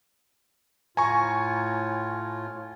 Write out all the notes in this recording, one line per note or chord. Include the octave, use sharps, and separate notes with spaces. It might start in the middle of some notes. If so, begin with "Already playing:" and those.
A2 F4 G#5 A#5 C#6